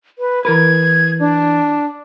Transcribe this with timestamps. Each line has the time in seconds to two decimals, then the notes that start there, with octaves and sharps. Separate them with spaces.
0.19 B4
0.45 E3 A#4 B4 G#6
1.20 D4